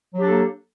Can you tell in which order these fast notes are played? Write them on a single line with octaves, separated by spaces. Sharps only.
F#3 G4 D4 A4 A#3